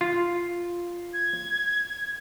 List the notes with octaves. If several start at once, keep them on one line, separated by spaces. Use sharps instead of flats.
F4
G#6